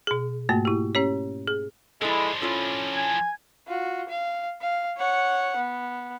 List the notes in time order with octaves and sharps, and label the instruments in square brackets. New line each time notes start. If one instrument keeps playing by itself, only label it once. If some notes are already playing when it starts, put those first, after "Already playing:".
[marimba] B2 G#4
G#2 A3 A#3 F#4
E4 G4
C#4 G4 C#5
G#4
[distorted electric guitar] F3 D4 [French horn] G#3 [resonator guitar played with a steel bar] E4 A4
[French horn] C#4 [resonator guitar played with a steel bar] E4 F4 A4
[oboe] G#5
[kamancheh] F4 F#4
F5
F5
C#5 F#5
B3